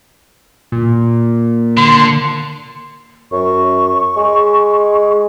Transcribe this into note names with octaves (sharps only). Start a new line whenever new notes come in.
A#2
D3 C6
F#2 C#6
G#3